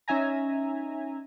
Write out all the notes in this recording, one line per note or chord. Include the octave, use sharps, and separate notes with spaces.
C#4 D#4 E5 G#5 A#5